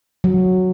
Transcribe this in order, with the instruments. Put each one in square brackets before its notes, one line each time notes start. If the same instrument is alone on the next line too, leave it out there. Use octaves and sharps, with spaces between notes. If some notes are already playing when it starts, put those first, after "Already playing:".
[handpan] F#3